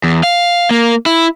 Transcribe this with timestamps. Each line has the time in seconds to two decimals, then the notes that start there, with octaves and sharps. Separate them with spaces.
0.04 E2
0.23 F5
0.71 A#3
1.06 E4